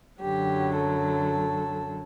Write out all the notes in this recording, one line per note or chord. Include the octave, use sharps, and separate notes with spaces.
F#2 D3 F#3 G4
A4